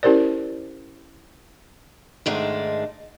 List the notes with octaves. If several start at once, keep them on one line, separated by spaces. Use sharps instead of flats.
C#4 E4 G4 A#4 C5 D5
G#2 D#3 G#3 A3 D4